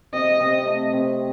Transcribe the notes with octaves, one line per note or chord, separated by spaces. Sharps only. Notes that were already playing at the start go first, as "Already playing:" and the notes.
C3 D#5
C3
A3
C3